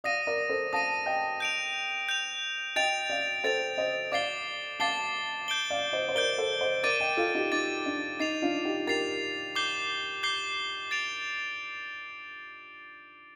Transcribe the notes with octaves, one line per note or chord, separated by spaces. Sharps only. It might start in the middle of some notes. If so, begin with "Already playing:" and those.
D5 F5 D#6 A#6 D#7
A#4 D5
A4 C5
F5 A5 D#6 A#6 D#7
D#5 G5
G6 D7 F7
G6 D7 F7
D#5 G5 A6 D7 F7
D5 F5
A4 C5 A6 D7 F7
C5 D#5
D5 F5 D6 A6 C7 G7
F5 A5 D6 A6 C7 G7
G6 D7 G7
D5 F5
C5 D#5
C5
A#4 D5 G6 D7 G7
A4 C5
C5 D#5
A#4 D5 D6 A6 D#7
D#5 G5
F4 A4
D#4 G4
D#4 D6 A6 D#7
D4
D#4 A6 C7 F7
D4 F4
D#4 G4
G4 A#4 A6 C7 F7
D6 G6 C7 G7
D6 G6 C7 G7
A6 D7 F7